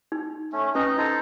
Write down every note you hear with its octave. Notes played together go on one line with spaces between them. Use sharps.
D#4
A3 C#4
C#4 D#4 B4 D#5 A#5
D#4 A4 C5 A#5